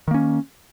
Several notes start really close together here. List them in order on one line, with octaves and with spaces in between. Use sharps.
D#3 A#3 C#4